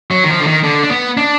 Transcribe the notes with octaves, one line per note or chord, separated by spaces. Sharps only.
F#3
D#3
F3
D3
D#3
D3
D4
B3
D4